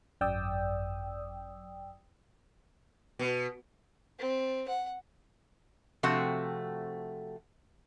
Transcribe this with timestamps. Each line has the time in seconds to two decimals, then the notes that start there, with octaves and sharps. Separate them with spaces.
0.21 G#1 F#2 D5 G5 D#6 E6
3.19 B2
4.19 C4
4.68 F#5
6.03 C3 F3 A3 C4 F#4 F#5